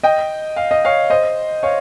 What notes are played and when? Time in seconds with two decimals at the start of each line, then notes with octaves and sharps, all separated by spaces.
0.03 D#5 G5
0.56 F5
0.71 D#5
0.85 C#5 F5
1.10 C5 D#5
1.63 C#5 F5